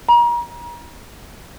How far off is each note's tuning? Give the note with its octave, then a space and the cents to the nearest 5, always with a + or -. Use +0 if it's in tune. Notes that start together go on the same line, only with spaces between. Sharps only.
A#5 +35